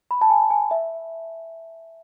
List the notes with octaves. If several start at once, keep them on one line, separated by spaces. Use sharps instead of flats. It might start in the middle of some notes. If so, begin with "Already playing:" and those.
B5
A5
G#5
G#5
E5